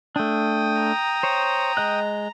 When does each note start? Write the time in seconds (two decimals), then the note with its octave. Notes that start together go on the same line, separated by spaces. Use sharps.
0.16 A3 D4 G5 D#6
0.81 A#5
1.23 C5 C#5
1.77 G#3 D#5 F#6